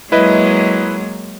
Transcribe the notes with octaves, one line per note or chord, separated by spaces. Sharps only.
F#3 G#3 A#3 E4 B4 D#5